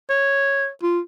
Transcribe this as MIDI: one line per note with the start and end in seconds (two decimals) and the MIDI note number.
0.10 0.68 73
0.83 1.00 65